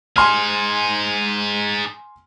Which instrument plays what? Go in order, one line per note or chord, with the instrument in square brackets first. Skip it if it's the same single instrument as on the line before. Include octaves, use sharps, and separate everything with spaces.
[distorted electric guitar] D#4 G#4 [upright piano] G#5 C6 F6